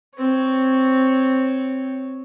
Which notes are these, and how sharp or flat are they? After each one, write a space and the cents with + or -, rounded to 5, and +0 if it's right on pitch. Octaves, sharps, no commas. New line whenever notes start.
C4 +0 C#5 +0